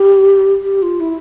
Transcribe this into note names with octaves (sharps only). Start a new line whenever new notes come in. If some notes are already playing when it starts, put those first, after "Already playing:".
Already playing: G4
G4
F4
E4